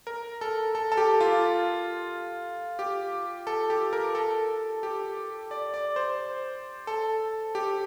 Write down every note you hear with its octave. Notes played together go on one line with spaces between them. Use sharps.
A#4
A4
A4
A4
G4
F4
G4
A4
G4
A#4
A4
G4
D5
D5
C5
A4
G4